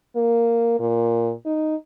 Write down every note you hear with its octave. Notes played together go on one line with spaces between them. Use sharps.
A#3
A#2
D#4